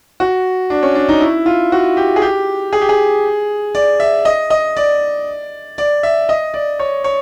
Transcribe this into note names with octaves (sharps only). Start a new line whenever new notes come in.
F#4
D4
C#4
D4
D#4
E4
F4
F#4
G4
G#4
G4
G#4
G4
G#4
D5
E5
D#5
D#5
D5
D5
E5
D#5
D5
C#5
C#5